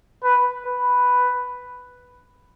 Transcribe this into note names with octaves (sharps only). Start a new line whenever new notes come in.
B4
B4